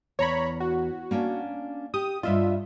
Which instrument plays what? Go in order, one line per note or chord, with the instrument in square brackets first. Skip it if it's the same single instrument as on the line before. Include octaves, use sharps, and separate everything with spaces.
[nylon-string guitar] E2 [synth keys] C#5 A#5 B5
[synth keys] F#4
[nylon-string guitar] A#3 C#4 D4
[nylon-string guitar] G4 [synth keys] D#6
[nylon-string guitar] G2 D4 D#5 [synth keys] F4 E5